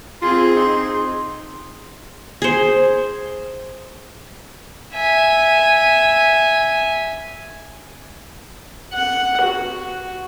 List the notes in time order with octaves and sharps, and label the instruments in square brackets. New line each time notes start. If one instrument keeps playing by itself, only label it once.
[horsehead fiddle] C4 G#4 [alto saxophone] F4 [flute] C6
[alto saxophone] D#4
[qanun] G#4 C5
[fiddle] E5 G#5
[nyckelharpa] F#5
F#4